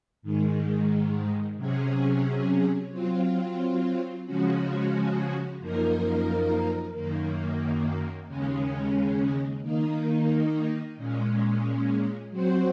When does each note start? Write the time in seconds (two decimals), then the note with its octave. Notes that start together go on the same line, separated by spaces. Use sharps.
0.22 G#2 D#3 G#3
1.57 C3 F#3 C#4 G#4
2.91 F#3 C4 F4
4.25 C#3 F3 G#3 C#4 F#4
5.60 F#2 F3 A#3 D#4 A#4
6.94 F#2 D#3 A#3
8.28 D#2 C#3 G#3 C#4
9.62 D#3 A#3 D#4
10.97 A#2 G#3 C#4
12.31 F#3 C4 F#4 C5